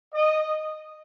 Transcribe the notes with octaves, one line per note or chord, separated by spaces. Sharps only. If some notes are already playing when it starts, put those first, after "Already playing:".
D#5